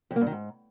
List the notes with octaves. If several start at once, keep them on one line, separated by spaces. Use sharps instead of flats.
F2
A#3
G2
D#3
G#2